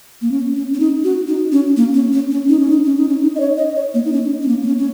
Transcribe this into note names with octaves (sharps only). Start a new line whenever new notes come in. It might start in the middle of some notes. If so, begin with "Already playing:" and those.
A#3
C#4
C#4
C#4
D#4
F#4
D#4
C#4
A#3
C#4
C#4
C#4
D#4
C#4
D#4
C#4
D#4
C#4
D#4
D#5
C#5
D#5
C#5
A#3
D#4
C#4
C#4
A#3
A#3
C#4
C#4